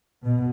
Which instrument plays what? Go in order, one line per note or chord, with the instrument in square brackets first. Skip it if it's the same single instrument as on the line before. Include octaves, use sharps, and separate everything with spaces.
[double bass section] B2